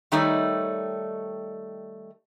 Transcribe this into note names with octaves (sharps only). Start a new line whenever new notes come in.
D#3 G3 A3 D#4 C#5 D5